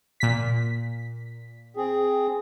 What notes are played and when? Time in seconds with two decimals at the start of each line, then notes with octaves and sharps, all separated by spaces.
0.20 A#2 B6
1.77 C4 G#4